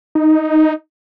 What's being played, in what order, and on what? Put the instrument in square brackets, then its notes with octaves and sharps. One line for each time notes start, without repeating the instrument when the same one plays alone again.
[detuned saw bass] D#4